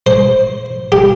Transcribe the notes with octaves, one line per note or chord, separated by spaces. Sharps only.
C5
G4